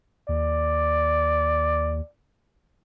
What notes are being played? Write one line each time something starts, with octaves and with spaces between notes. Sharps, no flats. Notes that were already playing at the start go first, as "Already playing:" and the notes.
D#2 D5